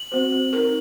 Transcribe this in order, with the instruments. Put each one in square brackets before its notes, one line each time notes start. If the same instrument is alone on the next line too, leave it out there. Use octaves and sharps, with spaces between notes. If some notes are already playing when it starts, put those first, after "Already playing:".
Already playing: [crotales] F#7
[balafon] C4 F#4 C5
C4
D#4 A#4